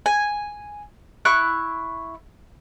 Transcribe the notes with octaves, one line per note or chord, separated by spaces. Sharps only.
G#5
E4 C#6 F#6